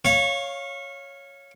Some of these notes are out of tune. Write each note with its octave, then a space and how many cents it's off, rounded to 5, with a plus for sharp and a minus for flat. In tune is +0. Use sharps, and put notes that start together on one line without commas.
C#5 +0 F5 +0 C#6 -25